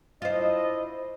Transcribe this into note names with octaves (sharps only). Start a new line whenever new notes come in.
D4 E4 F4 C5 D#5